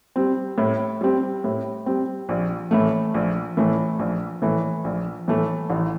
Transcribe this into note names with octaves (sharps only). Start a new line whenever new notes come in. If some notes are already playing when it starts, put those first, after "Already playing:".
G3 C4
A2
G3 C4
A2
G3 C4
A#1
A2 E3 A3
A#1
A2 E3 A3
A#1
A2 E3 A3
A#1
A2 E3 A3
A1